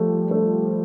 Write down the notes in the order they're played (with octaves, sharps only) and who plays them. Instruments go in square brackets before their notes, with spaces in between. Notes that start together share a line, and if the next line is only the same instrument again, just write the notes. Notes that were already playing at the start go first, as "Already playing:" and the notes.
Already playing: [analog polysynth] F3 G3 [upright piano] A3
[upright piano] A3